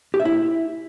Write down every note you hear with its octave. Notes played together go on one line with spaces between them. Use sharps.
G4
E5
E4